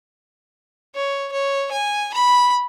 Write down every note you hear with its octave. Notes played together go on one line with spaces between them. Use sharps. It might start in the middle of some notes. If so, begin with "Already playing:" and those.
C#5
C#5
G#5
B5